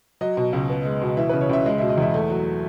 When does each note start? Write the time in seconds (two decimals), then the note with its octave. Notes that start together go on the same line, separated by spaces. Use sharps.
0.21 F#3 D#5
0.37 B2
0.53 C#2
0.69 B3
0.85 G#3
1.02 B2
1.17 E3 E5
1.29 C#3 B4
1.41 C#5
1.49 C#2 E5
1.66 G#3 D#5
1.78 B2 E5
1.89 D#5
1.98 E2 E5
2.14 A3
2.30 F#3